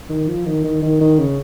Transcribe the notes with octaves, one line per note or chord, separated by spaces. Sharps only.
D#3
F3
D#3
D#3
D#3
D#3
C#3